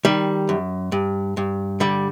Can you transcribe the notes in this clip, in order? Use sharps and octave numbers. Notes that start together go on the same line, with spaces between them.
D#3 G3
F#2
G2
G2
D3 G3